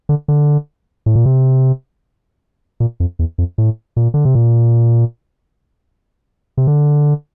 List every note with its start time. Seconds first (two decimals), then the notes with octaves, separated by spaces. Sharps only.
0.09 D3
0.28 D3
1.06 A2
1.15 A#2
1.26 C3
2.80 A#2
3.00 F2
3.19 E2
3.38 F2
3.58 A2
3.96 A#2
4.14 D3
4.25 C3
4.35 A#2
6.57 C3
6.67 D3